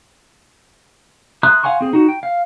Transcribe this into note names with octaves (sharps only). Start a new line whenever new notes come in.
E5 A#5 C6 D#6 F#6
F5 F#5 G#5 C6 C#6
C4 G#4
D#4 F#4
G5
F5